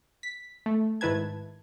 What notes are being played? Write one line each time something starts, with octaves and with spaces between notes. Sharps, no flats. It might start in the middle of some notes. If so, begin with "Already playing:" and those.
B6
A3
G#2 D#3 E4 B4 A5 G#6